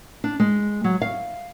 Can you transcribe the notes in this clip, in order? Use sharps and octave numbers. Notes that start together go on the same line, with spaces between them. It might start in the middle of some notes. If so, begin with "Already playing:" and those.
D4
G#3
F#3
F5